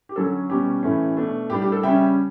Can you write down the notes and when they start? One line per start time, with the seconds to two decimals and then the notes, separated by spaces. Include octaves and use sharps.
0.09 G4
0.16 D3 F#3 C#4 A4
0.49 B2 G3 C#4 G4
0.83 A2 E3 A3 C#4
1.17 B2 A3 D4
1.50 A2 G3 D4 G4
1.62 G4
1.72 A4
1.83 C#3 G3 C#4 E5 G5